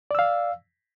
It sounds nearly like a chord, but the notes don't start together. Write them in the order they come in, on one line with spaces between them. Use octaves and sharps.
D5 E6 F5